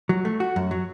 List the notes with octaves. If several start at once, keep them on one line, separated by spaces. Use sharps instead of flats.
F#3
A3
F#4
F#2
F#3